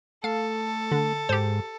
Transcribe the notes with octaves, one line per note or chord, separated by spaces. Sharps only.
A3 A4 F5
D3
G#2 G4 C5